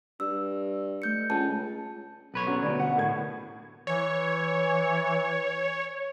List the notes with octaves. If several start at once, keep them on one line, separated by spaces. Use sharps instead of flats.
G2 E6
A3 G6 C#7
C#2 A5
B1 B4 C#5
E2 F#3 C#4
D2 B2 G3
F#5
D#2 A2 G#6
E3 C#5